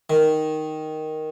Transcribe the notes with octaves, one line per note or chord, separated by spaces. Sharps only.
D#3